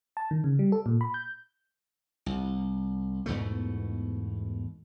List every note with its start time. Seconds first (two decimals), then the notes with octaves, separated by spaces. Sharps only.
0.17 A5
0.31 D#3
0.44 C#3
0.59 G3
0.72 A4
0.86 A#2
1.01 B5
1.14 G6
2.26 C2
3.26 E2 G#2 B2 A3